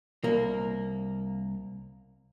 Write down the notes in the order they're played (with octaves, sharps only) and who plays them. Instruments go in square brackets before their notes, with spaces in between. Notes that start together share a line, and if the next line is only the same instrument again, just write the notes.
[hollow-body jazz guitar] C2 A#3